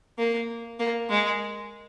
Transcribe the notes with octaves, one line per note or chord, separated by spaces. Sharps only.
A#3
A#3
G#3